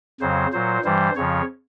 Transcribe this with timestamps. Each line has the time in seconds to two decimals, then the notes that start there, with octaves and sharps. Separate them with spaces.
0.21 F2 C#3 F#3 C5
0.52 A#2 F#3 C5
0.84 G2 E3 G3 C5
1.16 F2 C#3 F3 C#5